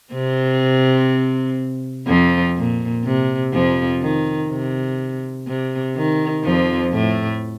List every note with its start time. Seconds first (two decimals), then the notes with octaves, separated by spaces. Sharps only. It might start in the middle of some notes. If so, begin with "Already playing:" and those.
0.13 C3 C4
2.07 F2 F3
2.56 A#2
3.05 C3
3.53 F2 F3
4.02 D#3
4.50 C3
5.47 C3
5.96 D#3
6.44 F2 F3
6.93 A2 A3